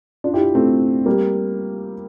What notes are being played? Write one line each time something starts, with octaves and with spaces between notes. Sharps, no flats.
D4 F4
E4 G4
A3 C4
G3 A#3